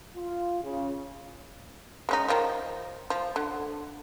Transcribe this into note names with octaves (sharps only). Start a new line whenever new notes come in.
F4
C#3
G#3 C#4 D#4
D#3 F3
F3
D3